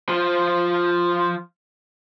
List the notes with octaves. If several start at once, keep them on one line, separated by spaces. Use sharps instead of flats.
F3 F4